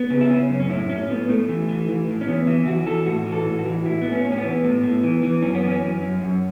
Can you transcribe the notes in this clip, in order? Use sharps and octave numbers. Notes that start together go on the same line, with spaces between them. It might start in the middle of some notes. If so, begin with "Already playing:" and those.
Already playing: B3
C#3
E4
C#3 C#4
F#2
C#4
A2 E4
A2 C#4
A2 B3
A2 A3
E3
E3
E3
A2
C#4
E3 B3
E3 E4
E3 F#4
E3 A4
A2 F#4
E3
A4
A2
F#4
E3
A2 E4
A2 B3
C#4
A2
C#4
B3
E3
A2
A2
E3
E3
F#2 C#4
B3
E3 C#4
F#2
F#2
F#2